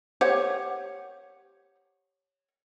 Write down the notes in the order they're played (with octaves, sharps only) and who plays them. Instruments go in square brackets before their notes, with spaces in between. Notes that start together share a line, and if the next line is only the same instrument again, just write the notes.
[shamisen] G4 C5 F#5 [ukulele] C#5